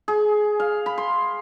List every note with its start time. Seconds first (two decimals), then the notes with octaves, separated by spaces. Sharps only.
0.08 G#4
0.60 F5
0.86 B5
0.98 C6